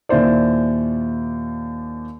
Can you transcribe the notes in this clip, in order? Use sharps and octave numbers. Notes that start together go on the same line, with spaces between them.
D#2 A#2 E4 C5 D5